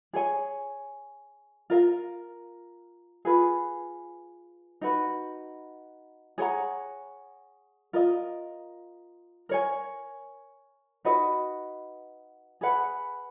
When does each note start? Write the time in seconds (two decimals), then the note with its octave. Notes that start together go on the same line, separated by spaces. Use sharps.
0.13 G#4 C#5 G#5
1.70 F4 A#4 F5
3.25 F4 G#4 B4
4.81 D#4 F#4 B4
6.38 G#4 C#5 F#5 A#5
7.93 F4 A#4 D#5
9.49 A#4 C#5 G#5
11.05 D#4 F#4 B4 D#5
12.61 G#4 B4 F#5